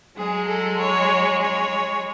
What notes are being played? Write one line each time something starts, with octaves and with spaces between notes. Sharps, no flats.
F#3 G#3 G#4
A4
C#5
C#5